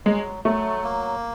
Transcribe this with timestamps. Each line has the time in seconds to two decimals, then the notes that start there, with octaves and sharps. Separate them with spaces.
0.05 F#3 G#3
0.45 F#3 A3
0.84 A#3